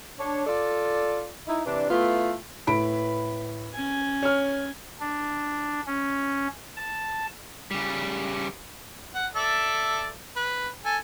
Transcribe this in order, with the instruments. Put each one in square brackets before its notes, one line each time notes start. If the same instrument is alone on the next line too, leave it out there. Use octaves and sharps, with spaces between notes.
[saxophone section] D4 C#5
F4 A4 D5
D#4 E4
C3 E3 D4
A3 B3 E4 F4
[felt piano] A2 B5 D7 [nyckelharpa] B4
[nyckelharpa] C#4 G#5
[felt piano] C#5 F6
[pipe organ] D4
C#4
A5
[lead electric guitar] C#3 G3
[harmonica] F#5
A4 D5 E5
B4
A4 G#5